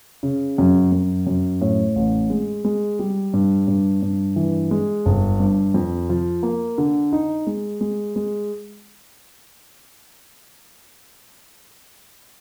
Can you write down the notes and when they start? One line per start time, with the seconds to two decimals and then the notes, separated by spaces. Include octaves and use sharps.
0.23 C#3
0.58 F#2
0.92 F#2
1.27 F#2
1.61 A2
1.96 A1
2.30 G#3
2.65 G#3
2.99 G3
3.33 G2
3.68 G2
4.02 G2
4.36 E3
4.71 G#3
5.06 G1
5.40 G2
5.74 F2
6.09 F3
6.43 A#3
6.78 D3
7.13 D#4
7.47 G#3
7.81 G#3
8.16 G#3